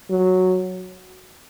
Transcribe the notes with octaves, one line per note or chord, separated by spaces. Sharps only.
F#3